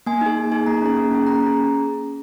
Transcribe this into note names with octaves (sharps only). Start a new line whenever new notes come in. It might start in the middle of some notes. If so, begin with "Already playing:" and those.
A#3 G#5
D#4 G#4
A#3
D#4 G#4
A#3 A#5
C#4 G#4
A#3
C#4 G#4
A#3 A#5
C#4
G#4